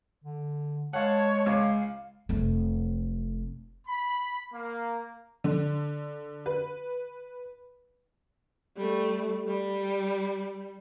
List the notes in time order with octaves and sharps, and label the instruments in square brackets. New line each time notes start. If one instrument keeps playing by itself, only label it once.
[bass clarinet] D3
[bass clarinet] G#3 [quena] C#5 [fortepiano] F5 F#5 [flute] A5
[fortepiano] C#2 [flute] F5
[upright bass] F1 A3
[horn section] B5
A#3
[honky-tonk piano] D3
B4
[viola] G3 A3
G3